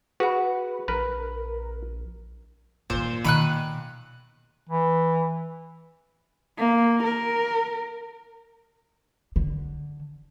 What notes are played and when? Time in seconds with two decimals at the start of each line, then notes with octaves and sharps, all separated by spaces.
0.20 F#4 G#4 B4 F#5
0.88 A#1 A#4 B4
2.90 G2 A#2 D#3 C5
3.25 B2 D#3 B5 D6 F#6 D#7
4.69 E3
6.58 A#3
7.03 A#4
9.36 D3